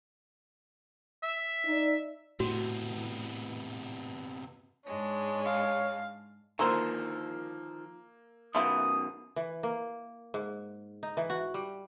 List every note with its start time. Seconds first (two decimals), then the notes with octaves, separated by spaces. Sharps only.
1.23 E5
1.65 D#4 D5
2.40 A2 C3 B3 F#4
4.86 G#2 G#3 D4 C#5
5.45 F5
6.59 D3 D#3 F3 A#3 C5 A#5 E6
8.55 F#2 B2 D#3 B3 E4 F4 D#6
9.36 E3
9.63 A#3
10.34 G#2
11.03 D#4
11.17 E3
11.30 F#4
11.54 G3